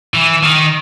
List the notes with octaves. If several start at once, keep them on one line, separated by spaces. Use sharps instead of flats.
E3
D#3